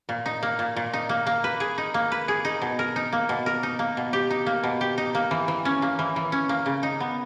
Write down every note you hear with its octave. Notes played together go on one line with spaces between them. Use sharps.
A#2
D#4
A#3
A#2
A#2
D#4
A#3
A#3
B4
G#4
D#4
A#3
B4
G#4
D#4
B2
A#4
D#4
A#3
B2
A#4
D#4
A#3
B2
G4
D#4
A#3
B2
G4
D#4
A#3
E3
E3
C#4
A#3
E3
E3
C#4
A#3
C#3
D#4
B3